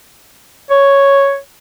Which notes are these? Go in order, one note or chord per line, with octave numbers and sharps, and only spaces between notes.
C#5